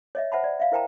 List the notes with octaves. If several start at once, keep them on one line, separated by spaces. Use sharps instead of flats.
C#5 D#5 E5
C5 E5 F#5 A5 B5
D5
E5 F5
E4 A#4 C5 G5 A5 A#5